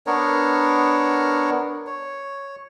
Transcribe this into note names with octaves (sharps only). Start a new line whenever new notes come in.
B3 D4 A#4 C#5
C#5